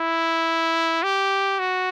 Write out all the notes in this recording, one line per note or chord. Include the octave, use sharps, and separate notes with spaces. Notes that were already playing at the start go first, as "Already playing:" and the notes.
Already playing: E4
G4
F#4